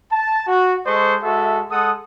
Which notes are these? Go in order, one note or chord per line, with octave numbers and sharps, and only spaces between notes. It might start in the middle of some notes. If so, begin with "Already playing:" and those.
A5
F#4
G#3 A4 C5 D#5 C#6
G#3 F#4 A4 E5
G#3 A4 F#5 D#6